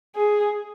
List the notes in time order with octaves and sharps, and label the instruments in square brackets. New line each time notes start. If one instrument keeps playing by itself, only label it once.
[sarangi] G#4